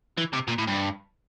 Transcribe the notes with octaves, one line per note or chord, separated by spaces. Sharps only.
E3
C3
A#2
A2
G2